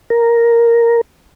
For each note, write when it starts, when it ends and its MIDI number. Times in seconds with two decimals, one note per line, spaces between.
0.10 1.01 70